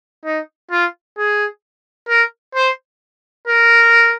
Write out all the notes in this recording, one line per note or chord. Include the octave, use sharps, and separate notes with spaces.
D#4
F4
G#4
A#4
C5
A#4